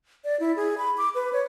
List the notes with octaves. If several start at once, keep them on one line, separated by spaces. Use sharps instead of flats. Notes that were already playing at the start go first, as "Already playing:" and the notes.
D5
E4
G#4
B5
D6
B4
C#5